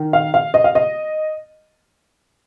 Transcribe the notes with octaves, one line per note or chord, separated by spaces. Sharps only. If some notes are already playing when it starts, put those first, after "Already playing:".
Already playing: D#3
F5
F5
D#5
F5
D#5